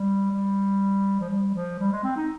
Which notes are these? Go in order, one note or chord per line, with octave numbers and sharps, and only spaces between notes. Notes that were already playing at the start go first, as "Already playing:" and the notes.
Already playing: G3
G3
F3
G3
F3
G3
G#3
C4
D#4